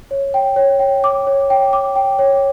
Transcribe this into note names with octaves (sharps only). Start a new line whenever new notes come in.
C#5
G5
C#5
G5
D6
C#5
G5
D6
G5
C#5